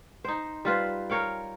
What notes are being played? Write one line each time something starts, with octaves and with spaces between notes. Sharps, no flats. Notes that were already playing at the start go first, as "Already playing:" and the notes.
D#4 C5
G3 F4 B4 C5
A#4 C#5 F5 G5